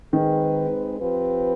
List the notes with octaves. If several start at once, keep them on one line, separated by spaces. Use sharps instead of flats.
D#3 G#3 C4 D#4 G#4 B4
F3 C4 G4 B4